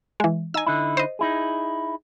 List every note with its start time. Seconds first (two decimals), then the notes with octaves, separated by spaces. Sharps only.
0.20 E3 G#3
0.54 D#4 G#5 E6
0.66 D3 D#4 E4
0.97 C5 D#5
1.19 D#4 E4 G#4